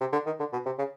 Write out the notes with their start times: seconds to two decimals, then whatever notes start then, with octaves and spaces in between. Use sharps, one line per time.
0.01 C3
0.12 D3
0.26 D#3
0.39 D3
0.53 B2
0.66 C3
0.78 C#3